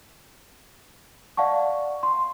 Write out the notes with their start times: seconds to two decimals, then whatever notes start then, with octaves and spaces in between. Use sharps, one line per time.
1.37 D5 F5 F#5 A5 C#6
2.03 C6